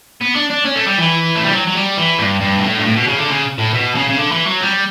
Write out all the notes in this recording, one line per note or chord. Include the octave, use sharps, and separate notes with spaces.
B3
D4
D4
C#4
A3
G3
E3
A3
G3
F#3
F#3
G3
E3
G2
G2
B2
A2
G2
A2
B2
C#3
D3
C#3
A2
B2
C#3
C#3
D3
E3
F#3
G3